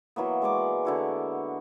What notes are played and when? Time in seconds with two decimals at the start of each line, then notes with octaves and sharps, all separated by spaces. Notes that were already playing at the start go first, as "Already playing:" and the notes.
0.16 E3 F#3 A#3 B3
0.42 G#3 D5 C#6 D6
0.85 D3 E4 F#4